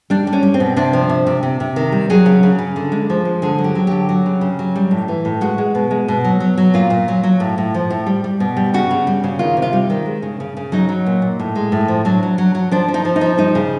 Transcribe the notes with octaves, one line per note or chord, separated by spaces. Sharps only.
G3 D4
G3
C#4
G3
C4
B2
C3 D4
F3
C3
C3
C3
C3
D#3
G3
F#3 G#4
C#3
C#3
C#3
D3
G#3
F3
G#3
D3 G#4
F#3
G4
F#3
D3 G4
F#3
C#3
C#3
F#3
G3
A2
E3
A2
G#3 F#4
G#3
B2
G#3
B2
F#3
F#3
F#3
A#2 F4
A#2
F#3
F#3
A2
A2
F3
A2
G3
G3
B2
G3
C#3 F#4
C#3
G3
C#3
D#3 F4
C3
F4
G3
D#3
G#3
C#3
C#3
C#3
F#3 D#4
F#3
A#2
A#2
A2
G#3
A2
F3
F#3 D4
F#3
F#3
F#3
F3 D4
F3
D#4
F3
D#4
F3
G3 D#4
C#3